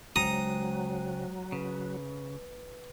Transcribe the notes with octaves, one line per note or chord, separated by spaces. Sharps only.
C#2 F#3 G#3 C5 G5 A#5 D#6
C#3 B4